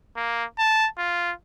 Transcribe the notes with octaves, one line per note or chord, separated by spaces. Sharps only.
A#3
A5
F4